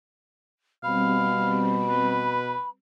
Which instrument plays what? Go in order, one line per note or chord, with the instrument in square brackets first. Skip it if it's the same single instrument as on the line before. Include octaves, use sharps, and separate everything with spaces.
[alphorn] B2 [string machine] G3 C4 [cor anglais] F5 [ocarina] B5
[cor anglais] B4